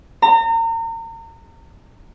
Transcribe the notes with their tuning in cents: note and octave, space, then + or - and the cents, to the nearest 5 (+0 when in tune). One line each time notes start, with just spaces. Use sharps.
A#5 -35